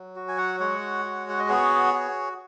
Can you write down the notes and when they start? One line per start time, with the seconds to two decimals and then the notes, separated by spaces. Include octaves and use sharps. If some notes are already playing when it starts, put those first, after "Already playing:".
Already playing: F#3
0.16 F#4
0.28 G#5
0.38 C#5 F#5
0.60 G#3 C#5 F#5
1.05 F#4
1.29 F#5
1.39 D#5
1.49 B3 G#4 C#5
1.93 F#4